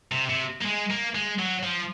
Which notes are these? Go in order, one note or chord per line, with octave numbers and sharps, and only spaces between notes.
C3
C3
A#3
G#3
A#3
G#3
F#3
F3